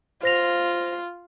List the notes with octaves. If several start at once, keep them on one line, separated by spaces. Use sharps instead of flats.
F4 C5 A#6 F7